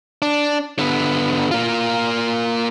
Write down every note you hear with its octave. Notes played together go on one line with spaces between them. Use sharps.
D4
D3 B3
A#3 F4